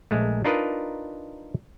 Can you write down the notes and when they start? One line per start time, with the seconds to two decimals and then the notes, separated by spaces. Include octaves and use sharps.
0.11 A#1 G#3 A3
0.44 D4 D#4 F4 A#4 B4 D#5